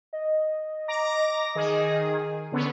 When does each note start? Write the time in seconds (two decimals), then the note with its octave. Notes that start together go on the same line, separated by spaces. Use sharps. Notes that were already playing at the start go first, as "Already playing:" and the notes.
0.13 D#5
0.88 A#5 D6 A#6
1.55 D#3 G#4
2.52 D3 B3 C#4